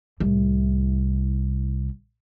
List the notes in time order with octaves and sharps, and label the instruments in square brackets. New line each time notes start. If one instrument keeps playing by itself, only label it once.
[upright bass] C2 A2